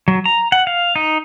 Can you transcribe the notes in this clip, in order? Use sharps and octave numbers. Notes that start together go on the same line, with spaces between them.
F#3
A#5
F#5
F5
D#4